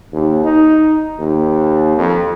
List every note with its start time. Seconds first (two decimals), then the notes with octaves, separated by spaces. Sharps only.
0.12 D#2
0.45 D#4
1.19 D#2
1.98 F2